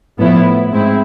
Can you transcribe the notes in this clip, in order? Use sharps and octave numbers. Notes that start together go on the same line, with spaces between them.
A2 F3 B3 E4
G#2 G#3 C4 E4